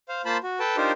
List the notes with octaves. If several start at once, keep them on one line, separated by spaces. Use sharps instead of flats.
C5 F5
A#3 F4 C5 A5 B5
F#4
A4 B4 G5 A5
D4 D#4 F4 G4 A#4 C5